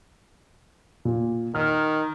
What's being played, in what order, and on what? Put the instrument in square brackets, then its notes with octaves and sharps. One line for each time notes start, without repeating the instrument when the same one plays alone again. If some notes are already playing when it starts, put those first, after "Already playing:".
[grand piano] A#2
[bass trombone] D#3 [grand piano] F6